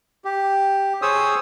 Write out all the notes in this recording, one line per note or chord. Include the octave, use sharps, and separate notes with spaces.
G4
G#4 C5 C#5 D#6 E6